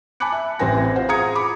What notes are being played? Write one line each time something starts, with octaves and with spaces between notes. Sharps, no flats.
G#5 A5 B5 D6 F#6 C#7
E5
A1 E3 C4 B4 G#5 A#6
F4 C5 F#5
F4 G#4 A#5 D#6 G#6 C#7
B5 D6